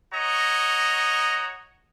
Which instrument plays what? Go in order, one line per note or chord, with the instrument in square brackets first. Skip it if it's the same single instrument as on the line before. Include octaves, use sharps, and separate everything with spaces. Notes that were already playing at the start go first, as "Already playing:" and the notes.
[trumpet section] F#4 C#5 D#5 A#5